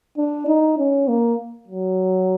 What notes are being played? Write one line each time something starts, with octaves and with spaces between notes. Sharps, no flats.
D4
D#4
C#4
A#3
F#3